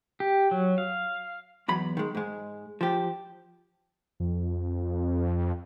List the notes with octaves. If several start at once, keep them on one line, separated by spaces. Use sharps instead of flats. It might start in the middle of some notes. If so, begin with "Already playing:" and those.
G4
F#3
F5
E2 F#3 B5
D#3 G#3
G#2 G#3
F3 G4
F2